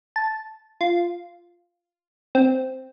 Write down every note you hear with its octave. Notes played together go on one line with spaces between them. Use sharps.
A5
F4
C4